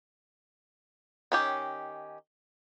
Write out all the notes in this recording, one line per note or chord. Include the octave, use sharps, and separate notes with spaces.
D#3 C#4 G4